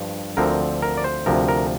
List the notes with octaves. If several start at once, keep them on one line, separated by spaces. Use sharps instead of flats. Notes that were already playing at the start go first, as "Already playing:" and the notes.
Already playing: G2 F3
D2 D3 F3 C4 A#4
A#4
D5
C5
D2 C3 F3 A#4
A#4